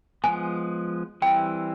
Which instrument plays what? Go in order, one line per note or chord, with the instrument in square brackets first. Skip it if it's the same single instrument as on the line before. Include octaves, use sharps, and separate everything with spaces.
[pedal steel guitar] F3 G#3 B3 [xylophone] G#5
[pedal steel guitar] E3 G3 C4 E4 [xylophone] G5